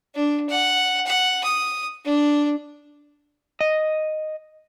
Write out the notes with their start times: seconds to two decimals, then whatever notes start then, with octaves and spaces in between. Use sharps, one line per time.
0.15 D4
0.49 F#5
1.06 F#5
1.44 D#6
2.05 D4
3.61 D#5